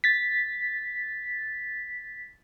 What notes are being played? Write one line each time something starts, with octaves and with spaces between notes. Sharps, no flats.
A6 B6